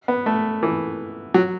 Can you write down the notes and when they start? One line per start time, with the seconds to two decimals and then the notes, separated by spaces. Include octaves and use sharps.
0.08 B3
0.26 A3
0.63 E3
1.34 F#3